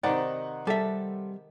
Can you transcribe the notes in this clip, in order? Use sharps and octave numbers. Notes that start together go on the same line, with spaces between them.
C3 D#3 D#4 C5 D5 F#5
G3 A4 E5